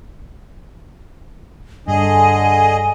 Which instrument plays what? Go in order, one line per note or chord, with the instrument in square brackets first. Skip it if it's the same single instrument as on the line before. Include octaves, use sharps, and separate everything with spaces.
[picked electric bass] G2 [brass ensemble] D3 [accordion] G#4 D#5 [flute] G#5